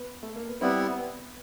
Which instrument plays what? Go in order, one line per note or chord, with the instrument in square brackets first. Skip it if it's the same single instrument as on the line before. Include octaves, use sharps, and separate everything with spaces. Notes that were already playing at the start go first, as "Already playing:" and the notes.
Already playing: [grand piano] B3
A3
A#3
B3
[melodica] G3 B3 E4 [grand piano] C4
[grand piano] B3